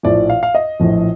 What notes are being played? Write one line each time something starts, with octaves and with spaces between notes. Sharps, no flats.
A#1 A2 F3 D5
F5
F5
D#5
A#1 A2 F3